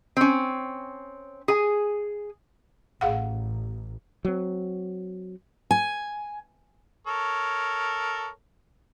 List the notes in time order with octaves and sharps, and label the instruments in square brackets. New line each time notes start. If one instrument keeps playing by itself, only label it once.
[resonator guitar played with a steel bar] C4 C#4
G#4 G#5
[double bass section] A1 [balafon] G#4 F5 F#5
[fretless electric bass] F#3 C4
[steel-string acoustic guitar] G#5
[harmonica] A4 A#4 C#5